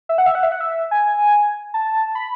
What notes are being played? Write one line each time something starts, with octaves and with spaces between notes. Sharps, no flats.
E5
F#5
E5
F#5
E5
F#5
E5
G#5
A5
B5